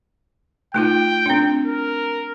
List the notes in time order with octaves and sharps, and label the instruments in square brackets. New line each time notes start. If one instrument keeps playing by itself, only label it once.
[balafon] A3 D#4 F4 [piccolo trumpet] G5
[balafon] C4 D4
[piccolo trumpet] A#4